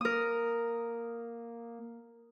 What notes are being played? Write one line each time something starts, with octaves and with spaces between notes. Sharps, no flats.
A#3 A#4 D#6